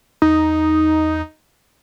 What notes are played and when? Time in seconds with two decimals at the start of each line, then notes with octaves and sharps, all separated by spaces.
0.22 E2 D#4